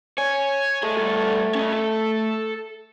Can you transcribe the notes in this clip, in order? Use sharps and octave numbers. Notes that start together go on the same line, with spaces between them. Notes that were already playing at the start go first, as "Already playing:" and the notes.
C#5 G#5
A3 G#4 D#5
G2 A4
C#4 D#5
A4